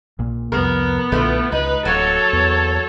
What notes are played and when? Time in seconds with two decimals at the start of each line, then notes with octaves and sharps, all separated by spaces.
0.19 A#1 A#2
0.52 C2 F2 B3 A#4
1.12 B1 A#2 D3 A3 E4 F4
1.52 C#2 D#4 B4
1.85 D1 F#3 A#3 A4 C#5
2.33 E2